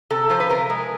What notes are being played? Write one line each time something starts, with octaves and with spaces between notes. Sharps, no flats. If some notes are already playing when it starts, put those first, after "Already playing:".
C3 A4
F3 C5
B4
C3 A#4
G#3